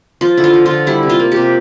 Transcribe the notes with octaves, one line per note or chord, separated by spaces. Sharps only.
F3 F4
D3 E4
F4
F3
F4
D3
G3 E4
C3
F4
A#3
C3 G4